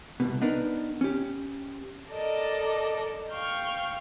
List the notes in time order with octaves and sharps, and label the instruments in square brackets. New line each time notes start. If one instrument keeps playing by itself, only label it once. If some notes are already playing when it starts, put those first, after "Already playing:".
[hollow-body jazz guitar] C2 F#2 B2
B3 D4 D#4 A#4 B4
C#4 G4
[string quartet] A4 A#4 D5 D#5 A5
F5 G5 C#6 F6 G6